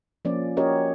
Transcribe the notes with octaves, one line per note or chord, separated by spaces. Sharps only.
F3 A#3 C#4 D5
C#4 F#4 G4 A#4 C#5 D#5